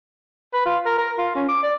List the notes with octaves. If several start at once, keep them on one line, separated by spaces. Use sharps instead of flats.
B4
F4
A#4
A#4
F4
C#4
D6
D5